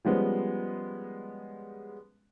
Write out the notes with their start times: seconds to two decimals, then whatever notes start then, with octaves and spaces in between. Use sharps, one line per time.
0.05 F3 G3 G#3 B3 C#4